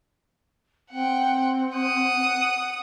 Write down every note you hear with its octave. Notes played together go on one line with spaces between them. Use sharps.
C4 F#5 G5
F#5 D#6